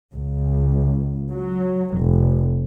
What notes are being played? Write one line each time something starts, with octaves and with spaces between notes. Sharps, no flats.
C#2
F#3
F1